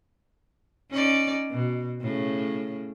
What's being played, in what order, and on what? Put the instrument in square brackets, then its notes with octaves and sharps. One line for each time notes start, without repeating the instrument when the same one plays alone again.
[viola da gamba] C#4 D#4 D5
B2
A2 C#3